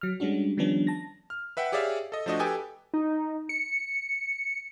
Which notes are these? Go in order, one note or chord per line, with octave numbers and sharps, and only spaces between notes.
F#3 F6
G3 G#3 C#4 D4 F#4
D#3 F3 G3 B3 C#4 D4
A5 A#6
F6
B4 E5 F#5 G5
G4 G#4 C#5 D5 E5 F5
A4 D#5
F3 A3 D4 F#4 D#5
G4 A4 B4 G5 G#5 D#6
D#4
C#7